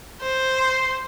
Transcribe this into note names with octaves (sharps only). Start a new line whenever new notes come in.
C5
C6